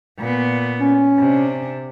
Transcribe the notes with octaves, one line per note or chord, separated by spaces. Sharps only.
A#2 B3
C#4
C3 D4